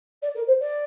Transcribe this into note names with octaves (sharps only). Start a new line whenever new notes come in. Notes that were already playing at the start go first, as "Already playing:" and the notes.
D5
A#4
C5
D5